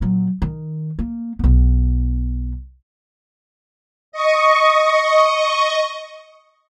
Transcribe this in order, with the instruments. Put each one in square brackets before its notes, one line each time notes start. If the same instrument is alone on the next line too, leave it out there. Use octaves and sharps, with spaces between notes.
[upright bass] A#2 F#3
D#3
A#3
B1 B3
[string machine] D#5 C#6